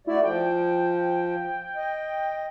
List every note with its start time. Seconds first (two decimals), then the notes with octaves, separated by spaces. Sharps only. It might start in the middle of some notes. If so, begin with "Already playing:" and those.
0.07 A3 E4 F#4 D5
0.24 F3 G5
1.75 D#5